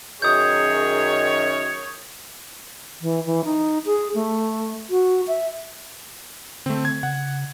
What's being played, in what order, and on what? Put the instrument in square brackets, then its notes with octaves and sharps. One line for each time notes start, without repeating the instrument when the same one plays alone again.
[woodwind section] F#2 D#3 [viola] G#4 [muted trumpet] C#5 [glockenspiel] D#6 G6
[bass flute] E3
E3
D#4
G#4
A3
F#4
E5
[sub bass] D3 [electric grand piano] A3 C4
[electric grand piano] G#6
[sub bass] C#3 [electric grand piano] F#5